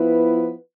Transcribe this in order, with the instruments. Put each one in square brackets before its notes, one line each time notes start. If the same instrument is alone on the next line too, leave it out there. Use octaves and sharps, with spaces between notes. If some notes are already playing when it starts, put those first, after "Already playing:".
Already playing: [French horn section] F3 B3 E4 B4